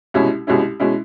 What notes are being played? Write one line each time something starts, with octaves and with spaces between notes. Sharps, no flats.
C2 B2 G#3 C#4 E4
C2 B2 G#3 C#4 E4
B2 G#3 C#4 E4